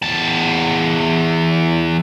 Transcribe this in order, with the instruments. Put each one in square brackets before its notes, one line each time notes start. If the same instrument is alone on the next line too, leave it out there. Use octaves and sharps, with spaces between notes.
[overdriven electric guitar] E2 A5